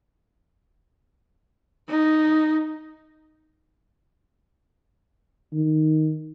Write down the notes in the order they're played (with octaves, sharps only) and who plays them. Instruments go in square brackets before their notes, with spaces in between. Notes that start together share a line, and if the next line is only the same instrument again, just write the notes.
[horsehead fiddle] D#4
[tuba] D#3